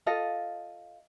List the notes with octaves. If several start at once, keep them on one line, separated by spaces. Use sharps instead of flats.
F4 A4 D#5 F5